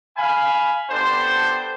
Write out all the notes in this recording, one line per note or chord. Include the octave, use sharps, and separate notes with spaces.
F5 G#5 B5
B3 D4 G4 A4 C5